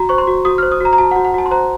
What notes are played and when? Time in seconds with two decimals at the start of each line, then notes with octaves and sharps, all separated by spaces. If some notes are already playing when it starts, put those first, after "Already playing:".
Already playing: F#4 A#5
0.09 C5 C#6
0.18 C6
0.27 F#4
0.45 F#4 D#6
0.58 C5 F6
0.72 D#6
0.81 F#4 A#5
0.93 A#5
0.98 F#4 A5
1.11 F#5
1.16 F#4
1.25 F#5
1.34 F#4 A5
1.46 C6
1.51 C5 A#5